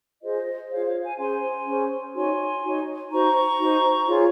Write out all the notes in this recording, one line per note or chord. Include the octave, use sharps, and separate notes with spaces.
F4 G#4 C5 D#5
F4 G#4 C5 C#5 F5
C#5 F5
F5 G#5
C#4 G#4 C5 G#5 C6
C#4 G#4 C5
D#4 F#4 C#5 G#5 C6
D#4 F#4 C#5
D#4 F#4 C5 A#5 C#6
D#4 F#4 C5
F4 G#4 C#5